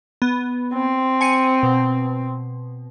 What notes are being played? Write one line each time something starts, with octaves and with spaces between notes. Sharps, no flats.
B3
C4
G#5 C#7 D#7
B2